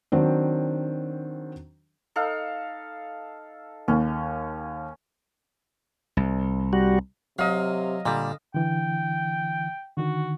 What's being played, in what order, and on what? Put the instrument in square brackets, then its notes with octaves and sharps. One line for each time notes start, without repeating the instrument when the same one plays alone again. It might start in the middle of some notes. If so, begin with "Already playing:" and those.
[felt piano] D#3 F#3 C4 D4
[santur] D#4 A4 F5
[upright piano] D#2 [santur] C#4
[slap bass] C2
[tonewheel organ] G3 F#4
[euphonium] C3 [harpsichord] F#3 [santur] D#5 F5
[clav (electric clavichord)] A#2 G3 [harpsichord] D3
[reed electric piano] D3 E3 [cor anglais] G5
[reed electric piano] D3 D#3 [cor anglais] F#4